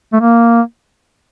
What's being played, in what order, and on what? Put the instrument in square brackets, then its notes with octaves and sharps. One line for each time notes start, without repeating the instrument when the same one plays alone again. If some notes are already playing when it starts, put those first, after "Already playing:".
[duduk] A3
A#3